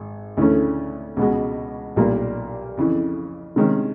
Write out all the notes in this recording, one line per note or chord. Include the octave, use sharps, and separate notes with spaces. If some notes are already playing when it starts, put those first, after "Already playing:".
Already playing: G#1
D2 C#3 E3 A3 C#4
C#2 B2 G#3
B1 A#2 G3 A#3
F2 C#3 E3
C3 D#3 G#3 C#4